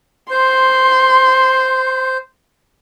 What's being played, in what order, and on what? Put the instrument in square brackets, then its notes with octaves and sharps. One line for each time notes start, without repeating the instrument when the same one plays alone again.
[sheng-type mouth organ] C5 [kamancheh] C6